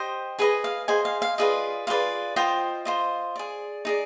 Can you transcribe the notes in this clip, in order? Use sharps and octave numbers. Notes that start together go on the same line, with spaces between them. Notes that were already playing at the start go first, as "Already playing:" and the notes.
Already playing: G4 C5 D#5
G#4 B4 D#5 G#5
F5
G#4 C5 D#5 G#5
F5
F5
F4 G#4 B4 D5 D#5
F4 G#4 B4 D5 F5
F4 C5 D#5 G5
F4 C5 D#5
G#4 D5
D#4 G#4 D5